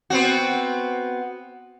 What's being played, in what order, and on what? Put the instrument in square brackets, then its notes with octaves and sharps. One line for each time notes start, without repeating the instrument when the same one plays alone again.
[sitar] B3 C4 F#4